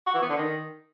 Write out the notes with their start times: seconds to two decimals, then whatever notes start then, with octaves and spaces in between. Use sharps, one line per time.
0.06 F#4
0.14 E3
0.22 B3
0.30 D3
0.37 D#3